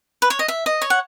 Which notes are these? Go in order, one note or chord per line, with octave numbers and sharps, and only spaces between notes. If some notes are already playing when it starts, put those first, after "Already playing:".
B4
C#5
D#5
E5
D#5
C#5
F#5